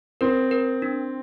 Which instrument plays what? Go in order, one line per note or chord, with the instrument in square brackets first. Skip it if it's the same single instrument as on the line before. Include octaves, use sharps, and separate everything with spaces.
[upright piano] C4 [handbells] A#4
[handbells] A#4
D4